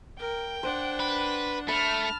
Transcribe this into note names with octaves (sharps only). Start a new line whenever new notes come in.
A#4 G5
D4 C5 F#5
B4
A3 A5 B5 F6